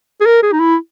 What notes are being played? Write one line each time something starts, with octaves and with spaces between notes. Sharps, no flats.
G#4
A#4
G#4
D#4
E4